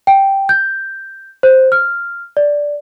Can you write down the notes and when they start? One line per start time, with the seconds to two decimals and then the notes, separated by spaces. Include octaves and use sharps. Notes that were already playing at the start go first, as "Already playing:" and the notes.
0.07 G5
0.49 G6
1.43 C5
1.72 F6
2.37 D5